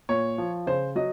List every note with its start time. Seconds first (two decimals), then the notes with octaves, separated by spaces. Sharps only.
0.09 A#2 C#5
0.38 F3
0.67 C#3 C5
0.95 F#3 D#5